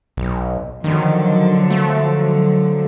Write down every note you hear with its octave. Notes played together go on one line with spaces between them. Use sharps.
B1
D3 D#3 F3 F#3
A3